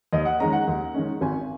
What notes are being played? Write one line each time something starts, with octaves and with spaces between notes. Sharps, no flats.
D#2 D#5
F#5
D#3 G#3 C#4 A#5
F#5
D#2
D#3 G#3 C#4
G#1 G#5